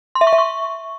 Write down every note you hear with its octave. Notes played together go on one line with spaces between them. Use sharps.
C6
E5
C#6
E5
C#6